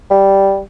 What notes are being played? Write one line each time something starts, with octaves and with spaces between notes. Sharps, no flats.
G3